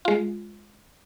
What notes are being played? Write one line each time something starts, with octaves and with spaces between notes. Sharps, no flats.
G#3 F4